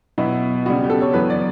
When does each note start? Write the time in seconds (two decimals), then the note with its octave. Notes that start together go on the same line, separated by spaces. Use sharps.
0.18 B2 F#3 B3 E4
0.66 C#3 G3 B3 F#4
0.84 G4
0.90 A4
1.01 C#5
1.13 F#2 E3 B3 B4
1.30 D5